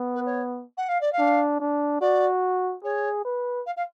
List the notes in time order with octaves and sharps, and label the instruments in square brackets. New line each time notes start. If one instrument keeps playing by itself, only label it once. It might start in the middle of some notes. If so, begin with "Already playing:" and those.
Already playing: [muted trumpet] B3
[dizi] B4
C#5
F#5
F5
D5
F5
[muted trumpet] D4
D4
[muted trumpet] F#4 [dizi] D5
[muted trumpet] G#4 [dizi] C#5
[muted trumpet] B4
[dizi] F5
F5